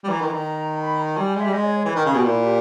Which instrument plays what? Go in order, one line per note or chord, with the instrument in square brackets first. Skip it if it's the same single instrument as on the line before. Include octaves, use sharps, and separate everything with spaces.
[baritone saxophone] G3
[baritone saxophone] E3 [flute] A#5
[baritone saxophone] D#3
E3
D#3
[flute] B5
A#5
[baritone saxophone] G3 [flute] G#5
[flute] G#5
[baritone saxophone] G#3
[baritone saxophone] G3 [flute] E5
[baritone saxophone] G#3 [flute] D#5
[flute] C#5
C#5
[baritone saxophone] E3 [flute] B4
[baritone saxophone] D#3 [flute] A#4
[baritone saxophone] C#3 [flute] G#4
[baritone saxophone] B2 [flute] G4
[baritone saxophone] A#2 [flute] E4
[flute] G4